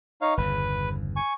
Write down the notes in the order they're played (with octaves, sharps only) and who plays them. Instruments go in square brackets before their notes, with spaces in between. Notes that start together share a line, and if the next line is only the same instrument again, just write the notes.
[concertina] D#4 C#5 F5
[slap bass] G1 E2 C#3 [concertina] B4
[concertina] G#5 C#6